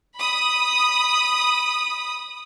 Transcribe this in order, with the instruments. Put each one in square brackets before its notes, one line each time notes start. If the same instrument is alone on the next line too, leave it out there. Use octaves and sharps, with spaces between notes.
[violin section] B5 D#6